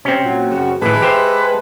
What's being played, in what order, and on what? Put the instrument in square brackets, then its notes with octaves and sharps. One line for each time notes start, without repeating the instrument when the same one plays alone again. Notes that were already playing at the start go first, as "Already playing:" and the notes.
[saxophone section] C3 [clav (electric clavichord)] C4 C#4
[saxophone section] A#2 F#3
F#2 C#3 F#4
[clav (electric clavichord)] A1 E3 [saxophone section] G#3 A4 B4
[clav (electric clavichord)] G4 C5 E5